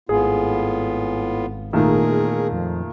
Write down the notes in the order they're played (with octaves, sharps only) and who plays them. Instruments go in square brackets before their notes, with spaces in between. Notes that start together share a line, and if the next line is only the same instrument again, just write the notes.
[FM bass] G#1 [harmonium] A2 B3 F4 [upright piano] G#4
[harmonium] E2 G#4 A#4 [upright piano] A#2 D#3 A3
[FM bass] F2